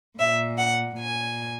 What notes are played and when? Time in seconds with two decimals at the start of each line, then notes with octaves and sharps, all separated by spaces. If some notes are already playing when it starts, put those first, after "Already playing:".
0.18 A#2 E5
0.57 F#5
0.97 A#2 G#5